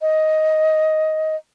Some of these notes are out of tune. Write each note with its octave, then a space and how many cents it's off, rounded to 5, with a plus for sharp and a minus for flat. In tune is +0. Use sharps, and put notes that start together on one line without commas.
D#5 +10